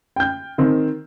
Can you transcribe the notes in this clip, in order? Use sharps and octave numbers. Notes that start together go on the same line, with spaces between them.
G5 G6
D#3 C4